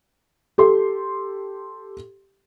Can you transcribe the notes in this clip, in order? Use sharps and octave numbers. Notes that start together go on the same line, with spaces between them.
G4 A4 C6